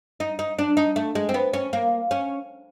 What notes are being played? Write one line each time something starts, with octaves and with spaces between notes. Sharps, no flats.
D#4
D#4
D4
D#4
A3
G#3
C4
B3
C#4
A#3
C#4